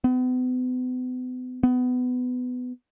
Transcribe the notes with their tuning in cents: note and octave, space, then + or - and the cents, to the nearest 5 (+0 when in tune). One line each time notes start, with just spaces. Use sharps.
B3 +40
B3 +20